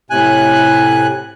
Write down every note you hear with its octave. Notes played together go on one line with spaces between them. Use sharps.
A2 C3 G#5 F#6